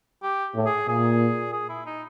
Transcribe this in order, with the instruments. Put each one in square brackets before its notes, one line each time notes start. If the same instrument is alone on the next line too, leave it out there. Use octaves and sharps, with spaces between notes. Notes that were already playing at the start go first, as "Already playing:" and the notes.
[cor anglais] G4
[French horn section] A2
[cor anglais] G#4
[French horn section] A#2 [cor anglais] G#4
[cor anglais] G#4
E4
D#4